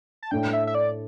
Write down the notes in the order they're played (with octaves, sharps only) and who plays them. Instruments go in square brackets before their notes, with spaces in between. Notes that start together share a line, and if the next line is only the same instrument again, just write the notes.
[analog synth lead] A5
[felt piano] A2 A3 D4 [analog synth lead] G5
[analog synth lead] E5
E5
D5